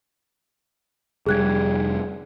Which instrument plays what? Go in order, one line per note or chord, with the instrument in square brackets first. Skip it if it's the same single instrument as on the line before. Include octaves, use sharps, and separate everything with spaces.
[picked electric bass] F1 G3 [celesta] G#4 F#6 G#6